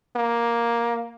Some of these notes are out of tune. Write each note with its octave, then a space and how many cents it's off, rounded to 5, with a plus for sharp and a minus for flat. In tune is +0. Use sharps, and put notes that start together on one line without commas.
A#3 +10